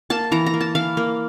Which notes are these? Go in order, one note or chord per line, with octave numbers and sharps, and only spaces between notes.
A#3 A5
E3 A#5
A#5
A#3
A5
E3 F5
A#3